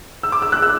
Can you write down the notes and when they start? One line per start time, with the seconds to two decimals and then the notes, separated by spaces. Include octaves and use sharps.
0.23 E6
0.32 D6
0.42 E6
0.52 F#6
0.62 E6